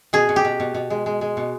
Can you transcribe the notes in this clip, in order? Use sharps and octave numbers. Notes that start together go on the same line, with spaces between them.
B2 G#4
B2
G4
B2
B2
B2
G#3
G#3
G#3
B2